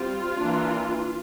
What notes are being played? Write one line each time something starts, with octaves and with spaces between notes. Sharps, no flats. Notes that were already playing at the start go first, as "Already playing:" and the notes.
Already playing: G3 C4 F4
E3 A#3 D4